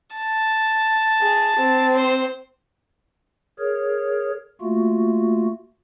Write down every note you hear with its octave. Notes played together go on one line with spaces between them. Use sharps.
A5
G#4
C4
C5
G#4 A#4 C#5
A3 A#3 F4 F#4